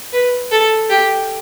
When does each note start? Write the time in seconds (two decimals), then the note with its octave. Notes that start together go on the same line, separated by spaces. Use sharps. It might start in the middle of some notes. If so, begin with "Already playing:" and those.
0.13 B4
0.52 A4
0.89 G4